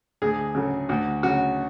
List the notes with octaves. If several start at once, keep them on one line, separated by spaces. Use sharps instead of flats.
D2 G#4
C#3 F#3 A3
D2 F#4
C#3 F#3 F#4